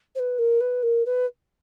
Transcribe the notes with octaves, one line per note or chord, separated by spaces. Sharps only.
C5
B4
A#4
B4
A#4
B4